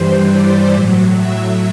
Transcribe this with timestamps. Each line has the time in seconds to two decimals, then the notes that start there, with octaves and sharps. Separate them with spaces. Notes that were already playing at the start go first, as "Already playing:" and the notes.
Already playing: G2 E3 G3 C5
0.31 D5
0.74 A2 F#3
1.15 E5